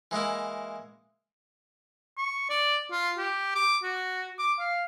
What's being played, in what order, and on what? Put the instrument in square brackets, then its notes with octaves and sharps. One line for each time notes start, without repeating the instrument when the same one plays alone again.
[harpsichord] E3 G#3 A#3 E4
[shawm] C#6
D5
F4
G4
D6
F#4
D6
F5